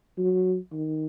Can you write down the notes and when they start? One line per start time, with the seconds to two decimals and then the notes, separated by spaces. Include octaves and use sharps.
0.18 F#3
0.72 D#3